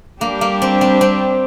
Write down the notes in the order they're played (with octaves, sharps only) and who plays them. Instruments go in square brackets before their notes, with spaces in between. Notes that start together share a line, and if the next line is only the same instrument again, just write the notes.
[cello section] G3 D4 G4 [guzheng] A#3
[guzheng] A#3
C4
C4
C4